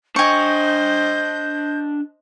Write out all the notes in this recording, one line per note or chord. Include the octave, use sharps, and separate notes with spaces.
D4 C5 D#5 G5 G#5 C#6 G6